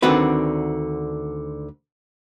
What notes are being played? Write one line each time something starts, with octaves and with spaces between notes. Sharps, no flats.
D2 D3 D#3 C4 F#4 B4